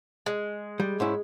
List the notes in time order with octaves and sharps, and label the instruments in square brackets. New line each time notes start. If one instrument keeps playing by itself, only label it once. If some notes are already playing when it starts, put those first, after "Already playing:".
[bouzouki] G#3
[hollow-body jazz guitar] G3
G#2 C#4 E4